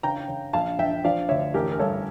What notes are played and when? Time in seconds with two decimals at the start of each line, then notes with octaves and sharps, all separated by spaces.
0.03 C#3 G5 A#5
0.28 C#3
0.53 A#1 F5 A5
0.78 A#1 E5 G5
1.04 F3 D5 F5
1.29 D2 C#5 E5
1.54 A1 G4 A#4
1.72 A#4
1.79 G2 A4 C#5